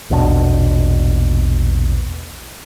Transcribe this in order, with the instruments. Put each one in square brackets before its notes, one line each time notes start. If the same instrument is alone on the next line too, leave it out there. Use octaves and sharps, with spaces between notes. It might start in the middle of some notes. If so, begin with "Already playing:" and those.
[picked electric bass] A#1 E2 B2 D4